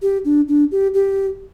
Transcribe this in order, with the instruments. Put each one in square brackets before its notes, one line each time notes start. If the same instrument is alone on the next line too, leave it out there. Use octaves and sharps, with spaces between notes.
[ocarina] G4
D4
D4
G4
G4